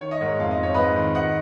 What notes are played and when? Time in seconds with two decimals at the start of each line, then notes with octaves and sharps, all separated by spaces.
0.01 D#3 C#5
0.11 D#5
0.21 G#2 A#4 C#5
0.39 F2 F5
0.51 D#5
0.57 F2
0.63 C#5
0.74 G#2 B4 D#5
0.96 D#3
1.15 D#3 D#5 F#5